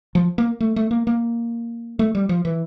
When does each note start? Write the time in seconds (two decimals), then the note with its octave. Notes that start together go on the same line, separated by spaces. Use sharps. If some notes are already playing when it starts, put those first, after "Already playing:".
0.15 F3
0.38 A#3
0.60 A3
0.76 A3
0.91 A#3
1.07 A#3
1.99 A3
2.15 G3
2.29 F3
2.45 E3